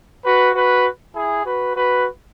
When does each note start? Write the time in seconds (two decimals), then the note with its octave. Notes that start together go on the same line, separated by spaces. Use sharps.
0.25 F#4 B4
0.55 F#4 B4
1.15 E4 G#4
1.45 F#4 B4
1.76 F#4 B4